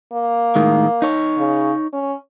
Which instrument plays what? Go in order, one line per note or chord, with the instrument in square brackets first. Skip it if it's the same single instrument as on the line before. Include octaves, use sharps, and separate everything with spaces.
[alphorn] A#3
[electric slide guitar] A2 D#3 G#3
D#4 C#5
[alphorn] C#3
C#4